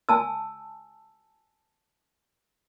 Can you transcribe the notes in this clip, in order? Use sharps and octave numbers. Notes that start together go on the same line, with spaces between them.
G#5 A5 E6